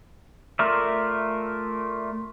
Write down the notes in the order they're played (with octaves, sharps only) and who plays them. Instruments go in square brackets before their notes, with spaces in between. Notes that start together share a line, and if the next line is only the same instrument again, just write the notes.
[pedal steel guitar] A3 F4 A#4 D5 E5